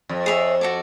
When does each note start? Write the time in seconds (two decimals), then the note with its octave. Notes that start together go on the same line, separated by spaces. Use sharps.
0.09 F2
0.26 G#4 C#5 E5
0.61 F#4 A4 D5